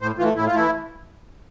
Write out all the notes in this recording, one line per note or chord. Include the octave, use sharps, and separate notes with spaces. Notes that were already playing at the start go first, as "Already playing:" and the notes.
A2 C5
E3 A3 F4
A2 E4
F4
E3 A3 E4